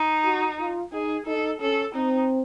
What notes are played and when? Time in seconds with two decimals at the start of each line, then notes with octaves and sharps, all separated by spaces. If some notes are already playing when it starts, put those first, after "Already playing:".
Already playing: D#4
0.24 F#4
0.58 F4
0.92 D#4 G#4
1.26 D#4 A4
1.61 C#4 A4
1.95 C4 D#4